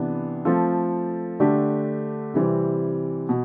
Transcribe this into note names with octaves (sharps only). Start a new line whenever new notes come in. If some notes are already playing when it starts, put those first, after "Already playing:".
Already playing: C3 E3 B3 D4
F3 A3 C4 F4 A4
D3 A3 D4 G4
C3 E3 G3 C4
B2